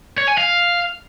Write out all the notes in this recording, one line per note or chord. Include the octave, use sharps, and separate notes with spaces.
C#5
G#5
F5